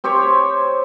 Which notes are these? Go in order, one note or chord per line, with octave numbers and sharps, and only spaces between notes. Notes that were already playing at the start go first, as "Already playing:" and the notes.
C4 G4 C5 C#5